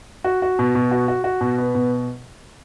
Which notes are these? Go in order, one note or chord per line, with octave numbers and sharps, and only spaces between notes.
F#4
F#4
B2
B2
F#4
F#4
F#4
B2
B3
B2